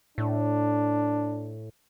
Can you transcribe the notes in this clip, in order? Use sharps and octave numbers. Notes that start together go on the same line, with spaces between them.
A2 D4